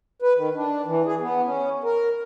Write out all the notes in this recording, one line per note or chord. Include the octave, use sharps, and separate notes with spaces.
B4
D#3
D4
E3
G#4
B3
C#4
A#4